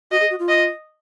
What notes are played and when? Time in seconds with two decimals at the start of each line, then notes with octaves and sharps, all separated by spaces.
0.11 F#4 D#5
0.21 G#4
0.30 F#4
0.39 F4
0.48 D#5